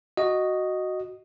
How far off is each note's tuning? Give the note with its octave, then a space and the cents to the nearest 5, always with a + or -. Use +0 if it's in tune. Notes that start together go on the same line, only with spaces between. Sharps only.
F#4 +0 D#5 -5